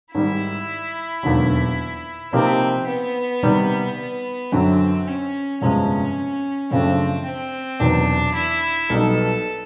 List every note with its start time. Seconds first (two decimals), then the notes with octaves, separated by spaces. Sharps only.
0.14 G#2 D#3 G3 E4
1.23 E1 D#2 D3 F#3
2.33 C3 F3 A#3 C4 D#4 G4
2.87 B3
3.43 C3 D#3 G3
3.97 B3
4.52 F#2 D3 F#3 C4
5.07 C#4
5.61 G1 F2 C3 F3 G#3 C#4
6.71 F#2 C#3 F3 A3 C4 D4
7.25 C4
7.80 E1 E2 C3 D#3 F#3 D4
8.35 E4
8.90 B1 B2 G3 B3 D#4 A4